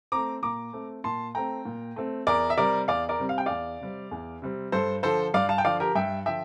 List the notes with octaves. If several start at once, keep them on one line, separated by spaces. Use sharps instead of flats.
A3 C4 A#5 D6
A#2 A#5 D6
A3 C4
A#2 A5 C6
A3 C4 G5 A#5
A#2
A3 C4
E2 A#4 D5
E5
C3 G3 C4 A#4 D5
E2 D5 F5
A#4 D5
C3 G3 C4
F5
G5
E2 D5 F5
C3 G3 C4
E2
C3 G3 C4
G2 A4 C5
D3 F3 A4 C5
G2 D5 F5
F5 A5
G5
D3 F3 D5 F5
G4 A#4
G2 E5 G5
D3 F3 E5 G5